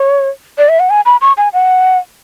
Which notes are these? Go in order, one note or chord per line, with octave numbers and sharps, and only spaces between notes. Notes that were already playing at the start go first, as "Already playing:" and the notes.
Already playing: C#5
D5
E5
F#5
G#5
B5
C#6
G#5
F#5